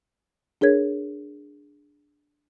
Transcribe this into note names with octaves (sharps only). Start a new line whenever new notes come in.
D4 G#4 A#4 C#5 G#6